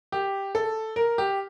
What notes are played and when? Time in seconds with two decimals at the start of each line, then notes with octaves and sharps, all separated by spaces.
0.12 G4
0.55 A4
0.96 A#4
1.18 G4